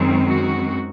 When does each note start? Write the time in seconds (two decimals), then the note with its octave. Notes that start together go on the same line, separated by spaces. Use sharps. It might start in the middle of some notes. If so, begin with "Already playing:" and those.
Already playing: F#2 D#3 G#3 C4
0.27 F#4